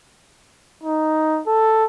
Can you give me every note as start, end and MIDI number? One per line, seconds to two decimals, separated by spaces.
0.83 1.41 63
1.47 1.85 69